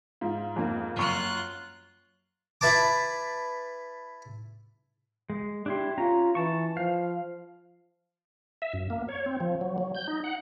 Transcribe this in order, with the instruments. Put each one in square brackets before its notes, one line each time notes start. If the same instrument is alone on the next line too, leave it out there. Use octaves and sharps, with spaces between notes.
[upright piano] G#2 [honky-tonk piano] F4
[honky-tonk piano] F2 A#3
[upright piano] F#2 C#6 [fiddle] F4 F#6
[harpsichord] E4 B4 A5 D6
[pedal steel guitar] G#3
[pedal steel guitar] D4 E4 C6 [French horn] G4
[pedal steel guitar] C#4 A#5 [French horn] F4
[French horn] E3 [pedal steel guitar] A5 C#6
[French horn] F3 [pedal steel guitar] F5
[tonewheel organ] E5
F#2
A#3
C#5
C4
F3
F#3
F#3
G6
D#4
F#5